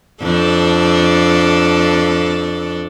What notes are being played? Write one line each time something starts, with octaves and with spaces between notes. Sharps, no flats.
F2 D4 A4